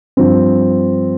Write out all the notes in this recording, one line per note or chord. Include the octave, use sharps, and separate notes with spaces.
G2 F3 C4